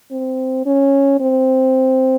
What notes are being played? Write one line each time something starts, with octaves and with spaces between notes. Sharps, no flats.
C4
C#4
C4